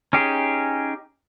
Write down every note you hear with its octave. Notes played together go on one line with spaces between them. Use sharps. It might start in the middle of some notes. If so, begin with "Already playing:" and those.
C#4 D#4 G4 G#4